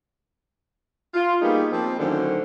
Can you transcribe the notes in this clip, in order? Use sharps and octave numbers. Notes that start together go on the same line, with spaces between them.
F4
G3 A#3 B3 D#4 G#4
F3 A#3 C4
F#2 A2 D3 D#3 C5